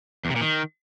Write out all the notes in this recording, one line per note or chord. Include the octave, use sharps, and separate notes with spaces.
E2
C3
A#2
D#3